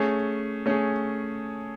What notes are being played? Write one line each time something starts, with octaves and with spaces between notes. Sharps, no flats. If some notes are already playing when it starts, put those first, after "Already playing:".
Already playing: A3 C#4 G#4
A3 C#4 G#4